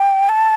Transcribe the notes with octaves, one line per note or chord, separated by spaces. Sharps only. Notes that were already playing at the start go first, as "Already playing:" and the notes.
Already playing: G5
A5